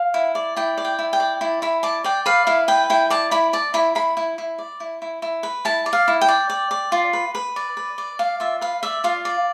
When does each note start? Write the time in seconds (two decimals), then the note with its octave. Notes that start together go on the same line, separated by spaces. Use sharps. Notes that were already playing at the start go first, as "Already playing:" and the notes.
Already playing: F5
0.14 E4
0.35 D5
0.57 E4 G5
0.77 D5
0.85 G5
0.99 E4
1.13 G5
1.20 D5
1.41 E4
1.62 E4 B5
1.83 D5 A5
2.04 D5 G5
2.26 B4 F5
2.47 E4 F5
2.68 B4 G5
2.90 E4 G5
3.10 D5 A5
3.31 E4 B5
3.53 D5 A5
3.74 E4 B5
3.95 E4 B5
4.17 E4
4.38 E4
4.58 D5
4.80 E4
5.02 E4
5.22 E4
5.43 B4
5.65 E4 A5
5.86 D5
5.93 F5
6.08 E4
6.21 G5
6.28 D5
6.50 D5
6.71 D5
6.92 F4
7.13 B4
7.35 B4
7.56 D5
7.77 B4
7.98 D5
8.19 D5 F5
8.40 F4 E5
8.61 B4 F5
8.83 D5 E5
9.04 F4 F5
9.25 D5